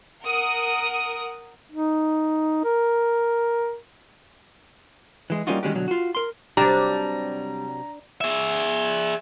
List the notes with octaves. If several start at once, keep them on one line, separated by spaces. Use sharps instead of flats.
A#4 F#5 D#6
D#4
A#4
E3 G#3
G3 A#3 C#4 D#4 F4 F#4
D#3 G3 G#3 C#4 F#4 G4
B2 D3 F#3
F4 F#4
A#4 C6
C3 F#3 G3 D4 A#5
G#4 E5